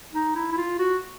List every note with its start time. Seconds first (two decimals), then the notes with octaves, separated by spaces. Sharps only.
0.13 D#4
0.36 E4
0.52 E4
0.57 F4
0.79 F#4